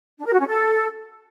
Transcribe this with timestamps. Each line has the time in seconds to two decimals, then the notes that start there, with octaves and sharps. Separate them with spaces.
0.19 D4
0.26 A#4
0.33 F#4
0.40 C#4
0.47 A4